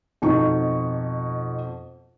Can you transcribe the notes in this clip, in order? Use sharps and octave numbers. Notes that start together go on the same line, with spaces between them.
F2 B2 D#4 C#6